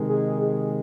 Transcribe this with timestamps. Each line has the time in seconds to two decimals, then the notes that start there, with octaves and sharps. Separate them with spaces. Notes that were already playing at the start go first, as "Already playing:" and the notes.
Already playing: C3 D#3 G#3
0.09 G#4
0.41 G#4